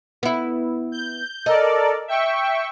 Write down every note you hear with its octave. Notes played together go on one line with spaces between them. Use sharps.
B3 E4
G6
A4 A#4 D5 D#5
E5 G5 C#6